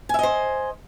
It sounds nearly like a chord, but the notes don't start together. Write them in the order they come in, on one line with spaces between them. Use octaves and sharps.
G#5 E5 D#5 C5